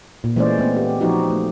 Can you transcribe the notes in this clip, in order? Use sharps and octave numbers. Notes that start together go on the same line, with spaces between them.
A#2
E3 G#3 A3 C#4 C5 D5
A3 B3 C4
G4
F3 D#4 F#4 G4
A3